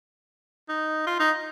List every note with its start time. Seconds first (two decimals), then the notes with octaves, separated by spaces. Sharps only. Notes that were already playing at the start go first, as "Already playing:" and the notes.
0.69 D#4
1.07 F4
1.19 D#4